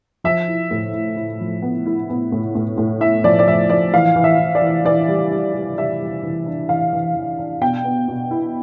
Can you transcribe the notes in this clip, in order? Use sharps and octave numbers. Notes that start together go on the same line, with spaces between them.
F3 E5
E4
A2
E4
E4
F3
B3
E4
B3
A2
A2
A2
E4 E5
F3 D5
D5
F3 E5
F3 D5
E3 F5
E3
E5
E3
D5
E3
E3 D5
G3
G3
G3
G3 E5
G3
E3
D4
E3 F5
E3
E3
D4
B2 G5
B3
B2
E4